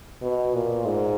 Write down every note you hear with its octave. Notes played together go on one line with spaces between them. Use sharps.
B2
A#2
G#2